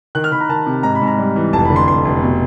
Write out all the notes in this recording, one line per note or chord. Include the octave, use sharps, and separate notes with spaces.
D#3 F#6
F6
D#3 B5
A#5
D#3 A5
C3
G#2 A#5
B5
G#2
A#5
G3
E3
F1 A5
B5
D3
C6
F1 C6
F1
B2